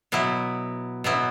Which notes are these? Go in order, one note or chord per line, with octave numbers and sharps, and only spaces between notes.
B2 F#3 B3 E4
B2 F#3 B3 E4